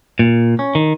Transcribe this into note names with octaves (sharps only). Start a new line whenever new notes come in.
A#2
C#4
D#3